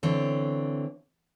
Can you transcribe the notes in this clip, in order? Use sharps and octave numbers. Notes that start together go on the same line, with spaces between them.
D3 E3 C4 C#5